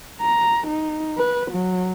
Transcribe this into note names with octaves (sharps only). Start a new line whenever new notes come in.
A#5
D#4
B4
F#3